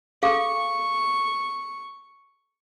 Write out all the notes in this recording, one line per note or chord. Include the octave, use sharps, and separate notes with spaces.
G#4 A4 F5 C#6